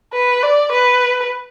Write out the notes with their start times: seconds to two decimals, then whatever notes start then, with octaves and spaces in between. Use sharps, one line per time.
0.13 B4
0.43 D5
0.71 B4